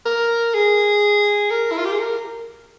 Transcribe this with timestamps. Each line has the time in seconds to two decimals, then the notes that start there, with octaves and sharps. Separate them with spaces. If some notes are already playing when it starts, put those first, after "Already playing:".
0.06 A#4
0.54 G#4
1.51 A#4
1.72 E4
1.78 F4
1.85 G4
1.92 G#4
2.00 A#4